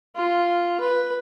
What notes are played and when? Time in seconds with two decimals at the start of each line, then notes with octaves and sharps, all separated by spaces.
0.15 F4
0.80 B4